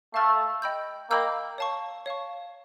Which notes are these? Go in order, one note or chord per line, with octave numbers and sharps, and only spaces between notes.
A3 F5 A5 C#6 F6
D#5 G5 B5 E6 G6
A#3 D#5 G5 B5 E6 G6
C#5 F5 A5 C#6
C#5 F5 A5 C#6